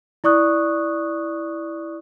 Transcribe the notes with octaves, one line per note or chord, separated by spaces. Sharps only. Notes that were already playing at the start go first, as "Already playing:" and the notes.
E4 D5 C#6 D#6 F#6